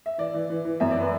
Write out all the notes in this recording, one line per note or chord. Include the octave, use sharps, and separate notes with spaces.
E5
E3 D5
E3
E3
E3
F#2 E5
E3 D5
B4